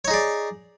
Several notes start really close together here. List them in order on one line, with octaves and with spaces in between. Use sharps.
C#5 D#4 G#4 D5